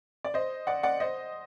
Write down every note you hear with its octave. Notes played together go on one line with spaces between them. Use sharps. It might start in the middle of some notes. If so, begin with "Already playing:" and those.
D5
C5 D#5
D5 F#5
D5 F#5
C5 D#5